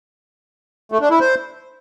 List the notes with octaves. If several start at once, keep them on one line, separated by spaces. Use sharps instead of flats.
A3
D4
E4
C5